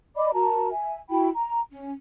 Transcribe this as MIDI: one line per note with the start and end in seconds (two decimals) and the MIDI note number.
0.16 0.30 74
0.16 0.30 75
0.16 0.30 83
0.16 0.30 86
0.34 0.69 66
0.34 0.69 70
0.34 0.69 81
0.34 0.69 82
0.71 0.97 76
0.71 0.97 80
1.10 1.29 64
1.10 1.29 66
1.10 1.29 79
1.10 1.29 83
1.33 1.60 82
1.71 1.92 61